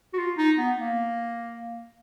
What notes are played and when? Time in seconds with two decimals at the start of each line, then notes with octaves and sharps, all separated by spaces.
0.13 F#4
0.18 F4
0.37 D#4
0.58 B3
0.77 A#3